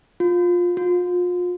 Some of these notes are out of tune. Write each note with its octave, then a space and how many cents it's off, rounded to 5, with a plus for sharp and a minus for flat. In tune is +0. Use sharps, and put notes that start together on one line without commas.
F4 +15
F4 +35